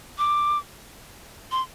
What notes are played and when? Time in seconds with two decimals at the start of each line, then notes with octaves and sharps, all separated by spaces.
0.18 D6
1.51 C6